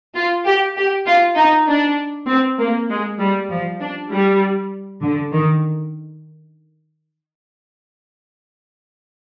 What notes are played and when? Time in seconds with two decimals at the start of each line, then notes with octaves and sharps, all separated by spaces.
0.15 F4
0.45 G4
0.76 G4
1.06 F4
1.36 D#4
1.68 D4
2.27 C4
2.58 A#3
2.89 G#3
3.19 G3
3.50 F3
3.80 D4
4.10 G3
5.02 D3
5.32 D#3